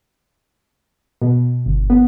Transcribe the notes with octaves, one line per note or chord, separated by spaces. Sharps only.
B2
G1
B3